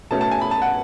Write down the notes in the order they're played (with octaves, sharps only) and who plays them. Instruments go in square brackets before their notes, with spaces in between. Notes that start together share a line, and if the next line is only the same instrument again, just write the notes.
[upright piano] B2 A3 C#4 A5
A5
G#5
B5
A5
F#5